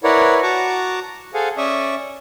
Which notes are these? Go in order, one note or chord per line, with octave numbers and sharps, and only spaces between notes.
E4 A#4 B4 C#5 D5 F#5
F#4 F#5 A5 A#5 C#6 D6
G#4 A4 C5 F5 F#5 G#5
C#4 D5 E5 C#6 D#6